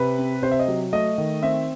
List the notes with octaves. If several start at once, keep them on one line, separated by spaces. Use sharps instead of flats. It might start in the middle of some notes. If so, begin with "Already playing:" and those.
Already playing: C3 B4
C4
C3 C5
E5
D#5
F#3
A3 D#5
D#3
C4 E5